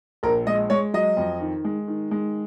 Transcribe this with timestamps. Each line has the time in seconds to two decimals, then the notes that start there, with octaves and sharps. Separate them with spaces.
0.23 A#1 A#4
0.46 G#3 D#5
0.70 G#3 C#5
0.94 F#3 D#5
1.17 F2
1.40 D#3
1.65 G#3
1.88 D#3
2.11 G#3